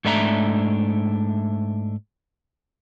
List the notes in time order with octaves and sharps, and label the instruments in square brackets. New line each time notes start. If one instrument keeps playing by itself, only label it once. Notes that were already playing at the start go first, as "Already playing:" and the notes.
[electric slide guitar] G#2 A3 D4 E5 A#5